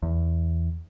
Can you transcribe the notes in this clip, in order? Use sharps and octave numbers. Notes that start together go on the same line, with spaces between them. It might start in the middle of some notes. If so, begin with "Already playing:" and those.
E2